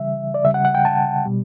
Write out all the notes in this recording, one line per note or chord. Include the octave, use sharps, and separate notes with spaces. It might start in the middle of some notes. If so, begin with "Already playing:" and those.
Already playing: C#3 E3 G3 E5
D5
C#3 G3 E5
F#5
F#5
G5
A5
B2 G3